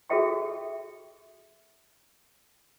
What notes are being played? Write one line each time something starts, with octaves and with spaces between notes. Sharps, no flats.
F#4 G#4 A4 E5 G5 C#6